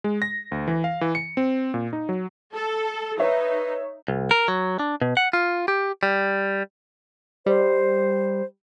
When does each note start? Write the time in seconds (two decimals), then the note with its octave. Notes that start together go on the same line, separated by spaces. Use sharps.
0.04 G#3
0.22 A#6
0.52 D2
0.68 E3
0.84 F5
1.01 E3
1.15 C#7
1.37 C4
1.74 A#2
1.93 D#4
2.09 F#3
2.53 A4
3.19 D#4 B4 C#5 E5
4.08 C2
4.31 A#4
4.48 F#3
4.79 D4
5.01 B2
5.17 F#5
5.33 F4
5.68 G4
6.03 G3
7.46 G3 C5